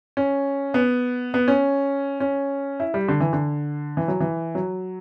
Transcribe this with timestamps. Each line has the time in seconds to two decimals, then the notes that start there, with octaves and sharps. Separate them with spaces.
0.17 C#4
0.74 B3
1.34 B3
1.48 C#4
2.20 C#4
2.80 E4
2.94 G3
3.08 D3
3.20 E3
3.33 D3
3.97 E3
4.08 F#3
4.20 E3
4.55 F#3